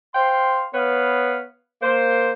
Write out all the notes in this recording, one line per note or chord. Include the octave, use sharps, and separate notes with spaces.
C5 F5 G5 C6
B3 B4 C#5 F5
A#3 C5